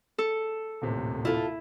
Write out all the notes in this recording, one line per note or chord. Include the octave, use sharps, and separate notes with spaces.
A4
D#1 A1 C3
E4 F4 A4